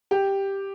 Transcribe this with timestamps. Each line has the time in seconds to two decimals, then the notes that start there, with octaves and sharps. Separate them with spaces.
0.11 G4